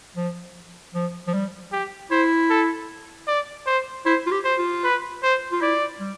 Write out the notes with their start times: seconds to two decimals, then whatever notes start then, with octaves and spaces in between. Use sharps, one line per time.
0.16 F3
0.94 F3
1.27 F3
1.34 G3
1.72 G4
2.11 E4 C5
2.50 A4
3.28 D5
3.66 C5
4.06 E4 C5
4.26 F4
4.31 G4
4.44 C5
4.58 F4
4.84 B4
5.23 C5
5.52 F4
5.61 E4 D5
6.00 G3